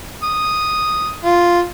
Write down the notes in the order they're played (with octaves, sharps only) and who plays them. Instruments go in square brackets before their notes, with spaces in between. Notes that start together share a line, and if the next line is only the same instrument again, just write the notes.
[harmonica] D#6
F4